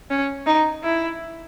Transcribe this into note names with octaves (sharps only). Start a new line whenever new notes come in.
C#4
D#4
E4